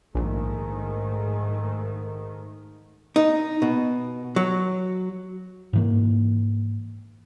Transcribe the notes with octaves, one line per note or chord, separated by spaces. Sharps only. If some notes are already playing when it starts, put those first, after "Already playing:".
A#1 G#2 D#3 A3
D#4
B2
F#3
G#2 E3 A#3